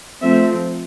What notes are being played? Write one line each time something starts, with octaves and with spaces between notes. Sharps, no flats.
F3 A3 C4 E5